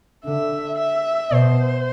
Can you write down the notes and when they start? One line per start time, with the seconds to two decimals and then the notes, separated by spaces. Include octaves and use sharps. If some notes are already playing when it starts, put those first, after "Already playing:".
0.25 D3 E5
0.79 E5
1.32 B2 C5